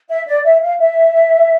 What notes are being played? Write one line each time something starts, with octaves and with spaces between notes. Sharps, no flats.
E5
D5
E5
F5
E5